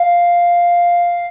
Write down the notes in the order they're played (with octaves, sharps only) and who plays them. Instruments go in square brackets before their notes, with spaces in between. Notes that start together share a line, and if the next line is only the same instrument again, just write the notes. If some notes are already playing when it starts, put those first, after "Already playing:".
Already playing: [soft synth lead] F5